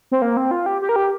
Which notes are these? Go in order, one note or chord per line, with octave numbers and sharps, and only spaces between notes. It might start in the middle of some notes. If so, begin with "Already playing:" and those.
C4
A#3
C4
F4
G4
G4
A#4
G4